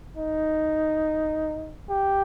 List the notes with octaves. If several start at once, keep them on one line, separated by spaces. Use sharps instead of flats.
D#4
G4